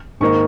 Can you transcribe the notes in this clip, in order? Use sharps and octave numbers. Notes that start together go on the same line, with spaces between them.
G#2 D#3 A#3 D#4 C#6